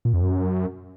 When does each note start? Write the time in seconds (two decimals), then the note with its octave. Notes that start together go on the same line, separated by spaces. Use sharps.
0.05 A#2
0.13 F2
0.22 F#2